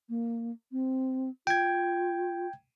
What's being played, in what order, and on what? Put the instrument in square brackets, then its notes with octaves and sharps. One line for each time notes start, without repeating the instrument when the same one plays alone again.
[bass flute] A#3
C4
[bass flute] F4 [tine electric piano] G5 G#6